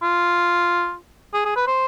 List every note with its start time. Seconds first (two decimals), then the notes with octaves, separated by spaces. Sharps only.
0.03 F4
1.34 G#4
1.45 G#4
1.56 B4
1.67 C5